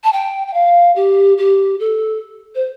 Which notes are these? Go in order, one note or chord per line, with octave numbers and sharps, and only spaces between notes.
A5
G5
G5
F5
G4
G4
A4
C5